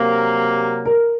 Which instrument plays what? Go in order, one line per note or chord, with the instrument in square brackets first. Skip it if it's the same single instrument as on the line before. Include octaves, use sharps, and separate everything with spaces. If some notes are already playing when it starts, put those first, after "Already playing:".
Already playing: [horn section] C3 F#3 A#3
[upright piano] A#4